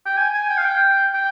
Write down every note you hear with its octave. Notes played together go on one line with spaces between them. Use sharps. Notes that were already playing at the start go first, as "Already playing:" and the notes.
G5
G#5
G#5
G5
F5
G5
G5